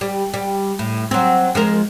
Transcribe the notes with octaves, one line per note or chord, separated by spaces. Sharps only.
G3
G3
A2
F#3 C4
F3 G#3 A#4